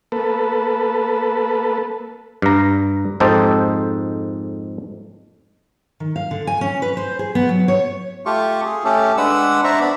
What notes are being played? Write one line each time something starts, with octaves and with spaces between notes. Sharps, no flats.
A#3 A4 B4
G2 A#5
F2 G#2 D#4 G4 A4 C5
D#3
F5
D3
G#5
C#4
B4
C5
G#4
B3
F#3
C#5
A3 F4 G4 C#6
G#4
A3 C#4 G4 A4
G#3 D4 B4 F#5 E6
D4 C5 D5 E5 A#5 C#6
B3 D4 B5